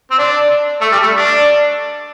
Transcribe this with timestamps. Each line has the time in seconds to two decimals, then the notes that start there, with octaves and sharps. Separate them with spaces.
0.11 C4
0.19 D4
0.81 A3
0.93 G3
1.03 A3
1.14 D4